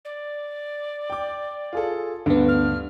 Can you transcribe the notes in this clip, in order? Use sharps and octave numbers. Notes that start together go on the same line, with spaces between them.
D5
G5 D6
F4 G#4 A4
D2 G2 D3 B3
F6